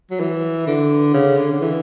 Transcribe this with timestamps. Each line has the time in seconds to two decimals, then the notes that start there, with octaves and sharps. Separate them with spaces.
0.11 F#3
0.20 E3
0.67 D3
1.14 C#3
1.37 D3
1.52 D3
1.61 E3